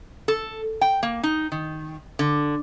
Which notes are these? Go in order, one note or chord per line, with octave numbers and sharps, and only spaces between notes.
A4
G5
A#3
D#4
D#3
D3